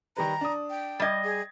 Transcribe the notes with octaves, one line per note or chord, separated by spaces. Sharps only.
D#3 G3 B4 A#5
D4 D#6
G5
G3 D#5 G#6 A6
G#4